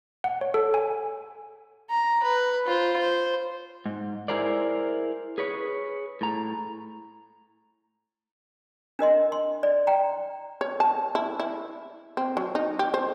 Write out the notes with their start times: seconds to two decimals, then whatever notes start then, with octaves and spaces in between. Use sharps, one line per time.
0.24 F#5
0.41 C#5
0.54 A4
0.74 G#5
1.90 A#5
2.23 B4
2.66 F4 C5
2.98 C5
3.86 G#2
4.28 E4 G#4 A#4 C5 D5
5.38 G#4 B4 C#5
6.21 A2 A#5
8.99 D4 A#4 D#5 C6
9.32 C6
9.63 D5
9.87 G5 A#5
10.61 C#5
10.80 A5
11.15 E4
11.40 E4
12.17 C4
12.37 F#3
12.55 D#4
12.79 G4
12.94 C5